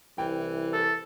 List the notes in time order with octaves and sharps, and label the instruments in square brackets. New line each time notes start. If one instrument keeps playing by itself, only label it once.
[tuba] C2 [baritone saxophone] E3 [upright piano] G5
[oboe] A4